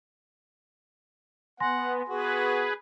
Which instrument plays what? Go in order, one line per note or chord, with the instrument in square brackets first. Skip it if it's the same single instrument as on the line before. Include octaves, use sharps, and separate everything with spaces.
[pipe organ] B3 [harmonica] F#5 [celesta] G#5 C6 A#6
[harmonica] B3 F#4 [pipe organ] G#4 B4